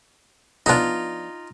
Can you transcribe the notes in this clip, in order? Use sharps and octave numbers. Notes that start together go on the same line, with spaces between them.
F3 B3 D4 D#4 F4